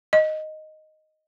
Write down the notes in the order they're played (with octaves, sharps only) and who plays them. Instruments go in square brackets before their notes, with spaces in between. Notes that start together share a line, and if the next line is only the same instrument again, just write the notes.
[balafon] D#5